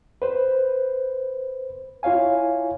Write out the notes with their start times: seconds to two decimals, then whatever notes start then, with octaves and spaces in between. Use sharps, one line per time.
0.22 B4 C5
2.03 E4 F4 C#5 F5 G#5